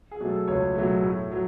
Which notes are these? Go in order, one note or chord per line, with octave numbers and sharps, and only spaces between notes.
G#4
B2 F#3 A3
A4
C#2 C#5
B2 F#3 A3
A2
F#3